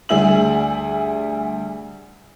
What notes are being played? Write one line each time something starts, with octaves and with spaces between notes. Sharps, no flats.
D2 G3 G#4 E5 F#7